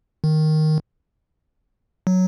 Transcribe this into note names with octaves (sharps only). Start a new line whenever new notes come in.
D#3
F#3